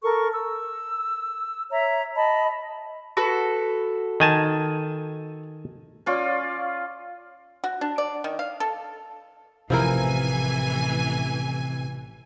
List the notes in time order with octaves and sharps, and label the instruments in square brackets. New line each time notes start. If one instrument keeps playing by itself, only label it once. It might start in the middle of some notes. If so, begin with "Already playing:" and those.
[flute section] A4 A#4 C#6
E6
C#5 E5 A#5
D#5 A5 B5
[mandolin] F#4 A4 B4
[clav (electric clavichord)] D#3 G#5 A5
[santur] C#4 F4 D5
[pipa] F#4
D4
D5
D#3
F5
A4
[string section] A1 E3 G#5 [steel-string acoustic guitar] C3 [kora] F3 E4 A#4